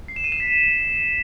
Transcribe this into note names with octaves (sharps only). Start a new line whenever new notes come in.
C7
E7
D#7
E7
B6